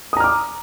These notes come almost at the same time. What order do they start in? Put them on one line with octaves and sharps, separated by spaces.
D#6 A#5 F6 D6